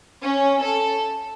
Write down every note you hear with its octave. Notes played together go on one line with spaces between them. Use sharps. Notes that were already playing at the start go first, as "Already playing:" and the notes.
C#4
A4